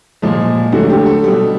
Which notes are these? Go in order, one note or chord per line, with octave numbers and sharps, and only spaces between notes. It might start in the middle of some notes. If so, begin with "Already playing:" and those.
A#2 F3 G#3
D3 F#3 A3 F#4
G4
A4
B2 G3